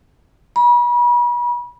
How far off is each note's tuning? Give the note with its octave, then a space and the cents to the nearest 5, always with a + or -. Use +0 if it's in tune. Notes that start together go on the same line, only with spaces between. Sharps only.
B5 -40